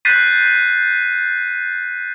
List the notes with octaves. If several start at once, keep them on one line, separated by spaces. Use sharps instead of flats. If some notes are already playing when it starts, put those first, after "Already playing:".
F#6 G6 A6 B6 C7 D#7